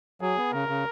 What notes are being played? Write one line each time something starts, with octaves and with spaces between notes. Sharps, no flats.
F#3 G#4
B3
C#3 A#4
C#3